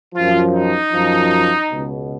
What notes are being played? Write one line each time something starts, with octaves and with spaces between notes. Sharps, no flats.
F#2 F3 F4
D#4
F#2 F3
C#2 B2